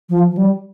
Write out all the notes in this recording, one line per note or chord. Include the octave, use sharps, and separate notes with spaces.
F3
F3
G3